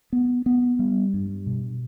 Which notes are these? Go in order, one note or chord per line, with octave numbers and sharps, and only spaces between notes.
B3
B3
G3
G2
B2